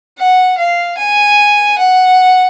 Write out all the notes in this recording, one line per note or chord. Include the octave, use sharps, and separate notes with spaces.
F#5
F5
G#5
F#5